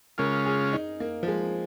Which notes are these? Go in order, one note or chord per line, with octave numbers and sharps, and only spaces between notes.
C#3 G#3 C#4 F4 A#4
G#4
D#4
A#3
F3
G#3